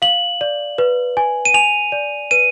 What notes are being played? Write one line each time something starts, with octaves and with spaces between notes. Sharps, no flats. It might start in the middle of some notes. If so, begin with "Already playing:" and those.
F5 F#7
D5
B4
G#5
D#7
G#5 F7
D5
B4 D#7